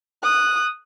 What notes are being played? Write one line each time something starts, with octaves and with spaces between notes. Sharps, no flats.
D#6 F#6